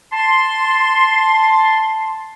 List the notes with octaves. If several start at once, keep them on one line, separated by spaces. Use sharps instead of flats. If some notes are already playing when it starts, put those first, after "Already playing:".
A5 C6